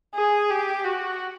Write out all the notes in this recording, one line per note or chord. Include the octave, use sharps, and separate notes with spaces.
G#4
G4
F#4